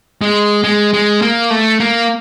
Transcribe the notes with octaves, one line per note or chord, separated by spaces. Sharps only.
G#3
G#3
G#3
A#3
A3
A#3